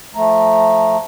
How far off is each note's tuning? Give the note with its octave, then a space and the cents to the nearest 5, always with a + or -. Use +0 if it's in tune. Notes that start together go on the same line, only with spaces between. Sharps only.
F3 +0 A3 +0 A#5 +0